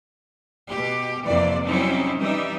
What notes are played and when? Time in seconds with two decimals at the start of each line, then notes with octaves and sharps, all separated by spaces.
0.69 B2 G4
1.26 F2 C3 E3 F3 A#3 D5
1.66 F#3 G3 C4 C#4 D#4 E4
2.19 E3 G3 D#4 G4 E5